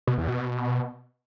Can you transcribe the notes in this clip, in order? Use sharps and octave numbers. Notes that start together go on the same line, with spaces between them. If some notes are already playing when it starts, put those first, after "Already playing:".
B2
E2
B2